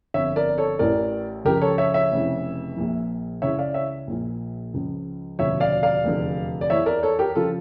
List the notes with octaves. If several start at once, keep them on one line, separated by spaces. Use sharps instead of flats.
G1 F2 D3 C#5 E5
A#4 D5
A4 C#5
A1 A2 E3 A#4 D5
C#2 C#3 F3 G4 A#4
A4 C#5
C#5 E5
C#5 E5
F1 F2 C#3 E3
A#1 A#2 F3
C#2 C#3 E3 C#5 E5
D5 F5
C#5 E5
A#1 A#2 F3
C#2 C#3 F3
E1 D2 C#3 F3 C#5 E5
D5 F5
D5 F5
F1 E2 D3 F3
D5
E2 E3 C#5 E5
A#4 D5
A4 C#5
G4 A#4
C#3 F3 F4 A4